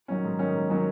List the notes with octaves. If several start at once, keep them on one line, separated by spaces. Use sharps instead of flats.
D#3 F#3 C#4
G#2
D#3 F#3 C#4
G#2
D#3 F#3 C#4